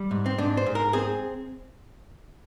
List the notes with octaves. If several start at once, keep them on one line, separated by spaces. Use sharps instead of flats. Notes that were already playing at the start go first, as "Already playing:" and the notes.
Already playing: G3
G#2
C4
G#2 D4
C5
G#2
A#4
C4 G#4